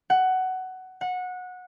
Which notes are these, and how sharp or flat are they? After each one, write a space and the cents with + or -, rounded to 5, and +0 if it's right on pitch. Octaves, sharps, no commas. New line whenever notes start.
F#5 +15
F#5 -20